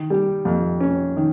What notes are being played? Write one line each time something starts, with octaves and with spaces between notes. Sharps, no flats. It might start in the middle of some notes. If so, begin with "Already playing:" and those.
Already playing: D#3
G3
F2
C#4
D#3